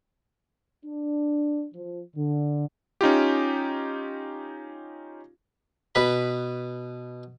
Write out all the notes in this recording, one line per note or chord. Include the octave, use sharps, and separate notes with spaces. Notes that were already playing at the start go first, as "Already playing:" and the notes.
D4
F3
D3
C#4 D#4 F4 G4
B2 B4 B5